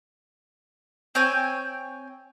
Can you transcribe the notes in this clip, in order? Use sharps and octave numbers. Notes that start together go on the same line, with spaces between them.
C4 C#5 G5 G#5